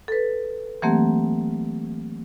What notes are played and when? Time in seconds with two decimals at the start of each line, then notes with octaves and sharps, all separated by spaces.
0.08 A4 B4
0.82 E3 F#3 A3 A#3 C4 G4